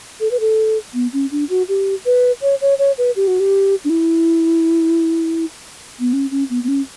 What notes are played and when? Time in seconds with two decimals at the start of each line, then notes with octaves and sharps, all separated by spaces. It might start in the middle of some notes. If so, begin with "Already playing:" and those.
0.20 A4
0.31 B4
0.40 A4
0.94 B3
1.13 C#4
1.31 D4
1.50 F#4
1.68 G4
2.06 B4
2.42 C#5
2.61 C#5
2.79 C#5
2.98 B4
3.16 G4
3.28 F#4
3.40 G4
3.85 D4
3.90 E4
6.00 B3
6.13 C#4
6.31 C#4
6.50 B3
6.64 B3
6.68 C#4